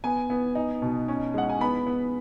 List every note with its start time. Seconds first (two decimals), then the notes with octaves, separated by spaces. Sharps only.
0.04 B3 G#5
0.30 B3
0.55 D#4
0.82 B2
1.08 C#4
1.34 G#3 F#5
1.49 G#5
1.61 B3 B5
1.87 B3